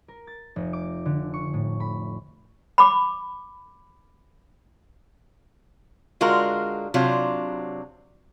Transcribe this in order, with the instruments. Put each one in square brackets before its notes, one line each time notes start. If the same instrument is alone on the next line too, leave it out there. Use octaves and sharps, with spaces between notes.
[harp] A#4
A6
F1
D6
D3
C#6
A2
B5
[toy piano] B5 D6
[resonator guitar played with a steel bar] D3 G#3 F4 F#4 A#4
C3 F#3 D4 F4